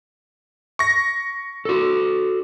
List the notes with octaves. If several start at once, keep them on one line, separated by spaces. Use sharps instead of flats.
C#6 A#6
F#4 A4